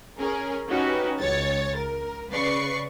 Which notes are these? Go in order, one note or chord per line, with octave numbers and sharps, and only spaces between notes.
C#4 G#4 A#4
C#4 D#4 F#4 G4 B4
C#2 C#5 A6
A#4
C#3 B4 D5 C#6 C7